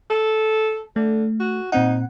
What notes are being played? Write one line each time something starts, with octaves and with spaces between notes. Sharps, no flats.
A4
D3 A3
F#4
A#2 C4 D#4 F#5